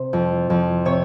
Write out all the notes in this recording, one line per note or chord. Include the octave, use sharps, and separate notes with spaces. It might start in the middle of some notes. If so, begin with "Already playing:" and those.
Already playing: C3 C5
F2
F2
C3 C#5